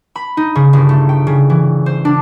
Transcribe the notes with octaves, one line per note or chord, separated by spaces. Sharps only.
B5
D#4
C#3
G1
A3
G5
C#3
E3
C5
D4